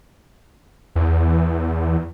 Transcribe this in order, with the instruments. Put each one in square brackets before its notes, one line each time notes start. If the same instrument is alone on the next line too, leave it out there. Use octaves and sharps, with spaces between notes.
[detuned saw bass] E2